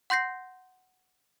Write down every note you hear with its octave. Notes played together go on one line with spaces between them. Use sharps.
F#5 C6 G6 A#6 C7